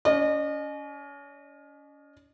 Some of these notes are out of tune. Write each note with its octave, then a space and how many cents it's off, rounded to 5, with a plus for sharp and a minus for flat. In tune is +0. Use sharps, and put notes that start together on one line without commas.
C#4 +35 D#5 -35